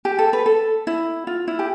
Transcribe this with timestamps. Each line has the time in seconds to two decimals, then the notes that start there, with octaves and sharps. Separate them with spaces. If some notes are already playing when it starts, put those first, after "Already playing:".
0.05 G4
0.18 A4
0.33 B4
0.46 A4
0.87 E4
1.27 F4
1.48 E4
1.59 G4